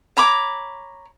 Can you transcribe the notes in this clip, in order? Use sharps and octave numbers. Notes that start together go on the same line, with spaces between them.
C#5 A#5 B5 D6